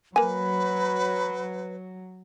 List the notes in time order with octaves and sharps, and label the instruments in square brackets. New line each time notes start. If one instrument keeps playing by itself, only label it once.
[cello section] F#3 [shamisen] A#3 G#5 [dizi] B4 [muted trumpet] B5